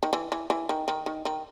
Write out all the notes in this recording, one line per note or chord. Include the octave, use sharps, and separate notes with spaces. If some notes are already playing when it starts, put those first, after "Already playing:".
D#3
E3
E3
E3
D#3
D#3
D#3
D#3